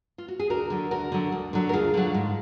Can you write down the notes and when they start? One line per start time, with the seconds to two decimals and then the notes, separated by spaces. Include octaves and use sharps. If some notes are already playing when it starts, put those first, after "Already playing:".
0.18 F4
0.28 F#4
0.39 G#4
0.50 D2 F#4 A#4
0.70 D3 F#3
0.91 D2 F#4 A#4
1.12 D3 F#3
1.32 D2
1.53 D3 F#3
1.69 A#4
1.73 D2 F4 G#4
1.94 D3 F#3
2.14 G#2